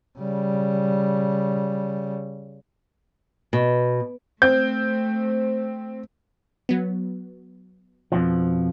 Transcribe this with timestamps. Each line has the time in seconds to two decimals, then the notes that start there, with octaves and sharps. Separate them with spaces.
0.19 C#3 G3
3.53 B2
4.42 A3 C4 G6
6.69 F#3 B3
8.12 F2 B2 F3